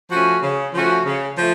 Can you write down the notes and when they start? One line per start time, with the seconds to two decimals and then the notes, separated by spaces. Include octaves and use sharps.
0.11 F3 A3 C#4 F#4
0.42 C#3
0.74 F3 A3 C#4 F#4
1.06 C#3
1.38 F3 A3